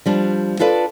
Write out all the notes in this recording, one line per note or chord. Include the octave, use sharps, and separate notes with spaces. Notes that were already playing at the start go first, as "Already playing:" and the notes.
F3 G3 D4
D4 F4 A4 B4 D5